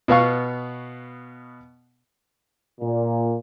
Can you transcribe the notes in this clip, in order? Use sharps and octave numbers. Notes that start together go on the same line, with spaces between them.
B2 B3 F5 C#6
A#2